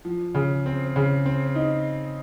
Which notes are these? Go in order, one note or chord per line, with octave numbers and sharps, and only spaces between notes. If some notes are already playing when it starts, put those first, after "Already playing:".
F3
C#3
C4
C#3
C4
D#4